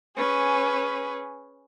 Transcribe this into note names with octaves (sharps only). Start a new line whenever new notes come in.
C#4 G#4 B4